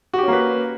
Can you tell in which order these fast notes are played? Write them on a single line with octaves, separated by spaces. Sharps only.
F#4 G4 C#4 A#3 B4